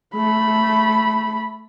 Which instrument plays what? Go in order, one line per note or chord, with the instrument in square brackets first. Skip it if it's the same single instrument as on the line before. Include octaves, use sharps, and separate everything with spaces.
[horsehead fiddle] A3 B5